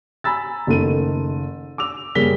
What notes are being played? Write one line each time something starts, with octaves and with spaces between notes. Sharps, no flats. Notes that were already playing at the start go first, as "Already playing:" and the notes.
G#5 A#5 B5 E6 A6
F#1 D#3 A3 A4 D#7
D6 E6 F7
F#2 C#3 G3 A#3 B6 G7